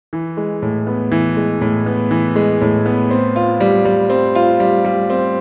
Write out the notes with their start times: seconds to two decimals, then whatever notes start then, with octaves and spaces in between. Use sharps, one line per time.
0.13 E3
0.37 G#3
0.62 A2
0.87 B3
1.11 E3
1.37 G#3
1.61 A2
1.86 B3
2.11 E3
2.36 G#3
2.61 A2
2.86 B3
3.10 C4
3.36 F4
3.60 G3
3.85 G3
4.10 C4
4.35 F4
4.60 G3
4.84 G3
5.10 C4